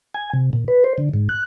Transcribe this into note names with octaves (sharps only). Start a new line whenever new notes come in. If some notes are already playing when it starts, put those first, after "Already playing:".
G#5
C3
A#2
B4
C5
D3
G#2
F#6